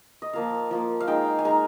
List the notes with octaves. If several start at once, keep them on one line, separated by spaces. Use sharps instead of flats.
D#5
F3 A#3 F4 F5
F3 A#3 F4
F5
G#3 D#4 G5
G#5
G#3 D#4 A#5